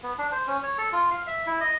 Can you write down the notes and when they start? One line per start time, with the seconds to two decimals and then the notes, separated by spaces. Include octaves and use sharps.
0.03 B3
0.18 D4
0.32 C5
0.47 C#4
0.63 C#5
0.78 A4
0.93 F4
1.11 F5
1.27 E5
1.47 E4
1.61 D#5